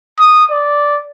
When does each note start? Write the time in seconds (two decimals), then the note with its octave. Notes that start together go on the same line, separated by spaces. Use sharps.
0.19 D#6
0.51 D5